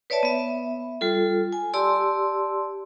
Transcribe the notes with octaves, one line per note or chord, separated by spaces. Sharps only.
B4 C#5 D5 E5 A5
B3 E5
G3 F4 A4
G#5
G4 D5 A5 C6 E6